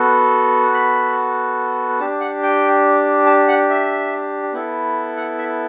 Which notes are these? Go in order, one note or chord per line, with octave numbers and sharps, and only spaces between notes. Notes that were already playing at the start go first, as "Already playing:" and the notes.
Already playing: B3 F#4 A4
B5
D4 G4 A5
F#5
G5
A5
F#5
E5
B3 E4 A4
F#5
E5